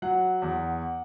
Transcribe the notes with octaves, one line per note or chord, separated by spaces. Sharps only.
F#3 F#5
E2